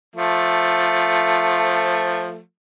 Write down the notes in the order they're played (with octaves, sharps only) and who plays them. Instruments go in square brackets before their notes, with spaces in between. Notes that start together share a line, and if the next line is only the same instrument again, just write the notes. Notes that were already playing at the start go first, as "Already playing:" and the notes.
[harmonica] F3 A3